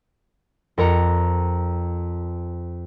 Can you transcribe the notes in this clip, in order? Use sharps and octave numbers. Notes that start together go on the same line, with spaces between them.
F2 A#4 A#5 C#7